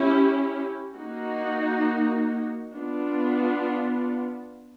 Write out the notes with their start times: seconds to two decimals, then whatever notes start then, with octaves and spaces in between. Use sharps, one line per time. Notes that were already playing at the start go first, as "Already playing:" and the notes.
Already playing: C#4 E4 G4
0.96 A#3 D#4 F#4
2.74 B3 D4 F4